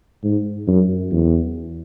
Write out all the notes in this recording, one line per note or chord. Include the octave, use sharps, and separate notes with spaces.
G#2
F#2
E2